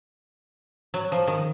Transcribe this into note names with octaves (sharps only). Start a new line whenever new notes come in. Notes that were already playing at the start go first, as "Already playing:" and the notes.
F#3
F3
D#3